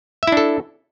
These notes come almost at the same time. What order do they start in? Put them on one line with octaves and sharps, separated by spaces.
E5 E4 D4 A4